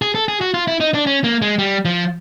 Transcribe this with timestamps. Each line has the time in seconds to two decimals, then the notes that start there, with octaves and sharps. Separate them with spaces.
0.02 G#4
0.15 A4
0.28 G#4
0.41 F#4
0.54 F4
0.67 E4
0.80 D#4
0.94 D4
1.06 C#4
1.24 A#3
1.42 G#3
1.59 G3
1.85 F3